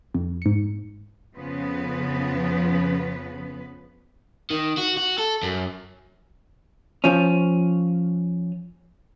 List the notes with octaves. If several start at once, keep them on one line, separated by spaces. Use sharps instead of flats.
F2
G#2 C#7
F2 C#3 F3 B3 B4
D#3
F#4
F#4
A4
F#2
F3 C#4